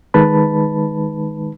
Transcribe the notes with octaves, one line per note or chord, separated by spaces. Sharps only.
D#3 G#3 D#4 B4 A5 B5